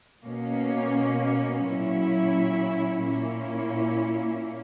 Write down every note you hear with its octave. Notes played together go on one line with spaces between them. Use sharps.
B2 A#3 C#4
A#2 F#3 C#4 E4
A#2 A#3 C#4 E4